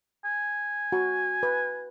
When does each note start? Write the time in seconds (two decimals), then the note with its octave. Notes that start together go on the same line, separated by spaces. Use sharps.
0.25 G#5
0.92 F#4
1.43 B4